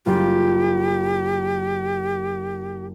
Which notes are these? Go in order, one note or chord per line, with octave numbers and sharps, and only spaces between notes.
F#1 F4 G4